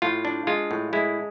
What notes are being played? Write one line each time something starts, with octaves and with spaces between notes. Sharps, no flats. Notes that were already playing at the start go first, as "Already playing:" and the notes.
A2 F4
D4
G#3 F4
A2
G#3 E4